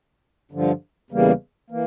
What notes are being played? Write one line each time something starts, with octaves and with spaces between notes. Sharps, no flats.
G2 D3 F3
E2 C#3 E3 G3 A#3
E3 A#3